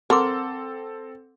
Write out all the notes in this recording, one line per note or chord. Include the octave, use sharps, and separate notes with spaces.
C4 A4 A#4 F#5 C6 D6